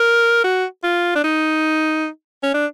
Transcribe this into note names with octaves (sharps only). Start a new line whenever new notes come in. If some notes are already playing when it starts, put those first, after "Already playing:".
Already playing: A#4
F#4
F4
D4
D#4
C#4
D4